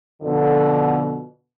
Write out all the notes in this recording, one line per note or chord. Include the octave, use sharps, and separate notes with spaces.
F2 B2 D3